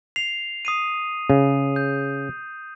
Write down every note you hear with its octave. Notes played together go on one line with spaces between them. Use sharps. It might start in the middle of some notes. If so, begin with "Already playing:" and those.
C7 F7
D#6 C7 D#7
C#3
G6